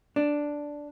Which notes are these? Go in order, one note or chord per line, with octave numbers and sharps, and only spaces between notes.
D4